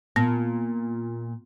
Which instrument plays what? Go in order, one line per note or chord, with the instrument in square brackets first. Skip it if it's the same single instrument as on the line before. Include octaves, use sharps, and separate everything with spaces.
[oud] A#2 [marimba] B3